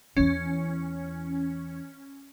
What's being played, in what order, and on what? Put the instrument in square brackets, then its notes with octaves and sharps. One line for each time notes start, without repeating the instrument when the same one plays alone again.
[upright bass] E2 E3 [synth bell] C#4